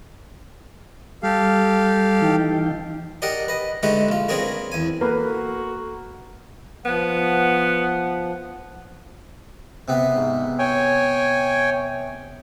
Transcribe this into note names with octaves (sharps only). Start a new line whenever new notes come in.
G3 G4 A4 F5
E3 D#4 G5
G4 A#4 D5 D#5 F#5 G5
B4 D#5
D3 G#3 A3 D#4 G4 B4
A#1 F4
F#3 B3 C4 D4 G#4 A#4
E2 G#5
A#3 F#4 A4 B4
F3 B3 F#5
C3 B3
G#2
C#5 G5 G#5